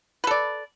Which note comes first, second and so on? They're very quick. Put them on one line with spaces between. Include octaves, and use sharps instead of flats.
B4 A4 D5